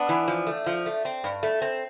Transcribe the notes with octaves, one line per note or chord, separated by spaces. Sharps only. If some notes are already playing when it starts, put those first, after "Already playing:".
Already playing: B3 D4
E3
F3
A3
F3
A3
C4
G2
A3
C4